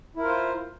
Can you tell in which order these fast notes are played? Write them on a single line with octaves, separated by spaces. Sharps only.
E4 A#4 F4 C5